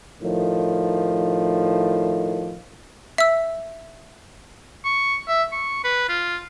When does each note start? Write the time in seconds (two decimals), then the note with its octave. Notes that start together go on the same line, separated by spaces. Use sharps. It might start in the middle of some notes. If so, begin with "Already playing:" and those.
0.22 A2 D#3 F3
3.18 E5 E6
4.85 C#6
5.28 E5
5.52 C#6
5.84 B4
6.09 F4